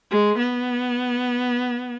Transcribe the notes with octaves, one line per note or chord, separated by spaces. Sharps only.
G#3
B3